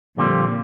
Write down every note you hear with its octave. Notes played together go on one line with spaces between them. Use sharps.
F2 A#2 D3 G3 C4 F4